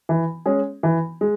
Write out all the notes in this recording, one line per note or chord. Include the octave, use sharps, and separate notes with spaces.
E3
G#3 C#4 G#4
E3
G#3